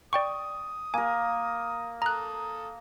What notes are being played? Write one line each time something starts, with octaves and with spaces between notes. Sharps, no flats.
D5 G5 C#6 D#6
A#3 A#4 G#5
A4 A#5 D#6 F#6